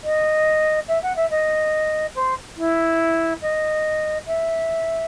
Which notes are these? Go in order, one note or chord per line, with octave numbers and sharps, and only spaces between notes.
D#5
E5
F#5
E5
D#5
C5
E4
D#5
E5